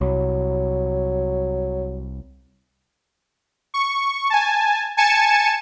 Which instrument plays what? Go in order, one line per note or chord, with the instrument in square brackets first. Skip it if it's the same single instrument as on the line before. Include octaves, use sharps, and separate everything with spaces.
[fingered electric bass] C2 [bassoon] F#3
[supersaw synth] C#6
G#5 A5
G#5 A5 C#7 E7